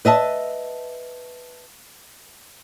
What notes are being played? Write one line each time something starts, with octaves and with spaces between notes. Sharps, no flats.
B4 D#5 E5 A5